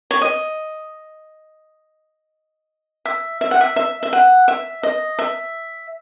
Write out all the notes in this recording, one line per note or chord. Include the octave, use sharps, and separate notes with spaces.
C#5
D#5
E5
E5
F#5
E5
E5
E5
F#5
E5
D#5
E5